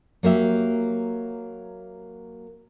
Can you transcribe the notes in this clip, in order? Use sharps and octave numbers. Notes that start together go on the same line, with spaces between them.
F#3 A#3 G4 E5